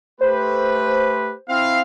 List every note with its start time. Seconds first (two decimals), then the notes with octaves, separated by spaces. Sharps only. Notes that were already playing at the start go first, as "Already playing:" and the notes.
0.21 A3 G4 B4 C5
1.49 C4 E4 F5